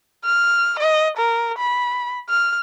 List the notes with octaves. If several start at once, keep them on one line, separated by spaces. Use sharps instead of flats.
F6
D#5
A#4
B5
F6